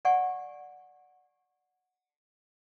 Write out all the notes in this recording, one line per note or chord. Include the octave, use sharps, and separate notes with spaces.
D5 F#5 G#5 C#6